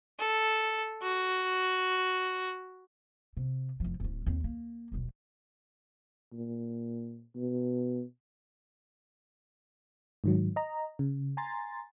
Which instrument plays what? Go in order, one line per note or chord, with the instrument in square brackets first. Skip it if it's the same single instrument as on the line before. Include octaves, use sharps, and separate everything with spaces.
[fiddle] A4
F#4
[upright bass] C3
F1 F3
D1 C#4
D#2 C4
A#3
D#1 B1
[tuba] A#2
B2
[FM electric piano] G#2 D#3 F#3
D#5 A#5
C#3
G#5 A#5 C6 A6